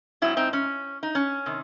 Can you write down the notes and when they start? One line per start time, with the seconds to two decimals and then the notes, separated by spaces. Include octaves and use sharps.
0.22 G#2 F#3 C4 E4
0.37 C4 D#4
0.53 C#4
1.03 D#4
1.15 C#4
1.46 C3 D#3